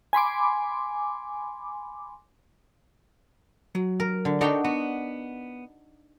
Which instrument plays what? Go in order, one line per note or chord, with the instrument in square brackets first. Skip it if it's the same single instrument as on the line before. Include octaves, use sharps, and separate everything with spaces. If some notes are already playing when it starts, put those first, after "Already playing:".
[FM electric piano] G#5 B5 C6 D6
[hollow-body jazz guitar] F#3
[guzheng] A#4
D3
[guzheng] D4 D#4 F#4 [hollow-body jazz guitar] A4 C#5 G5
[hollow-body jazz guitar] B3 [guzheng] F#4